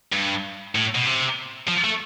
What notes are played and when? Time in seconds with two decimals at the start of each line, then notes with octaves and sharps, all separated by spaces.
0.13 G2
0.75 A2
0.95 B2
1.06 C3
1.68 F3
1.84 A3